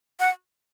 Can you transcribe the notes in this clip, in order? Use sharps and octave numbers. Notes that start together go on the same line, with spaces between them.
F#5